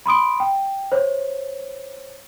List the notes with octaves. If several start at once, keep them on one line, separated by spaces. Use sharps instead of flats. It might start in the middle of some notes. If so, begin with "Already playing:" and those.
B5 C6 D#6 D7
G5
C5 C#5